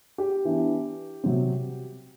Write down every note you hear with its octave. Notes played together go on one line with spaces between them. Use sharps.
G4
E3 B3 D4
C3 F#3 C4